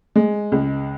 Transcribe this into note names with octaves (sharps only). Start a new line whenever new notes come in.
G#3
C#2